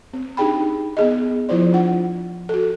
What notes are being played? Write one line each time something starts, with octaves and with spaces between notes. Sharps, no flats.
C4
D4 D#4 G4 G#4 G5 B5
B3 G#4 D#5
F3 E4 F4 C5 D5
D4 F4 F#5
F#4 A4